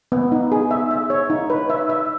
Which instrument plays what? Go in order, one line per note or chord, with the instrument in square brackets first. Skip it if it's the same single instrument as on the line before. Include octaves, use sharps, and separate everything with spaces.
[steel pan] B3
D#4
G#4
E5
E5
C#5
D#4
B4
E5
E5